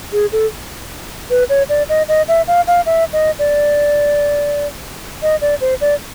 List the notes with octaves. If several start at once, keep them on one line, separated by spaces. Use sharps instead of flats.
G#4
A4
B4
C#5
D5
D#5
D#5
E5
F5
F5
E5
D#5
D5
D#5
D5
C5
D5